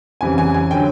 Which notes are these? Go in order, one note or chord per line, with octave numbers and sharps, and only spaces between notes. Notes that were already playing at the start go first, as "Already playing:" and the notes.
F2 C#3 E3 G3 G#5
G#5
G#5
D3 F#3 G5